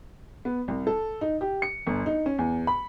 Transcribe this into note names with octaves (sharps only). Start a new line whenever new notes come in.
B3
C2
A4
D#4
G4
C#7
G1
D#4
C#4
E2
B5